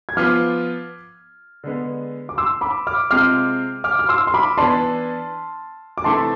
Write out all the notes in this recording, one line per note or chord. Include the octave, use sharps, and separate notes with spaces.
G#6
F3 B3 F4 D6 F6
D3 G#3 B3
D6
C6 E6
B5 D6
D6 F6
C3 G#3 C4 F4 D6 F6
D6 F6
F6
C6 E6
C6
B5 D6
E3 B3 D4 A5 C6
D6
C3 E3 A3 E4 A5 C6